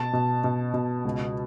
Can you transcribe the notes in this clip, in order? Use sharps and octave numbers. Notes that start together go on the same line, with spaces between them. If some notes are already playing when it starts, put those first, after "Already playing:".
Already playing: B2 A5
B2
B2
B2
C#2